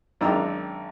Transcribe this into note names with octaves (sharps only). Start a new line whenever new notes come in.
G#1 F#2 D4 G5 A#5 E6